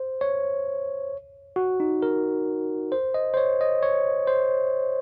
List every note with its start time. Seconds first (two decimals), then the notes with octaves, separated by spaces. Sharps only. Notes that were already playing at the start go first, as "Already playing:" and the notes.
Already playing: C5
0.21 C#5
1.56 F#4
1.80 D#4
2.02 A#4
2.92 C5
3.14 D#5
3.34 C5
3.37 C#5
3.61 D#5
3.83 C#5
4.27 C5